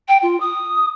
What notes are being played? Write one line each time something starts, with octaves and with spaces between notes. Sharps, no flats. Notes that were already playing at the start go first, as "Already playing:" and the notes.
G5
F4
D#6